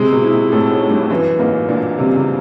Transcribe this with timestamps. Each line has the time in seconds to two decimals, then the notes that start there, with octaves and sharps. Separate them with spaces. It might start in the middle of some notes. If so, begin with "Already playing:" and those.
Already playing: C3 G#3
0.12 B2
0.22 E4
0.32 A#2
0.52 A2 A4
0.71 G#2
0.81 C#4
0.90 G2
1.10 F#2 E3
1.39 G#2 A#3
1.69 A#2 D4
1.98 C3 G3
2.13 C#3